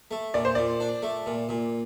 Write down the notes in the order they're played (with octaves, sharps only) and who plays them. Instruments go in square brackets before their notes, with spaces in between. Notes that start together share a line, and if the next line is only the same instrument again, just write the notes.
[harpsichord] A3
[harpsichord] A#2 [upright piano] D5
[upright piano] C5
[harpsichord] A#2 [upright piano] D5
[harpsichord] D4
A3
A#2
A#2